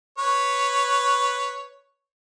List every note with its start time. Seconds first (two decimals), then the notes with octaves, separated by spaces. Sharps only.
0.18 B4 C#5